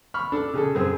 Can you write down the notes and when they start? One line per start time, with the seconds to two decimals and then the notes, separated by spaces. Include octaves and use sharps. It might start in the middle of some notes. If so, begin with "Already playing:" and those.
0.14 B5 C#6 F6
0.32 D4 A4
0.54 C#3 G#4 A4
0.75 F#2 C4 G#4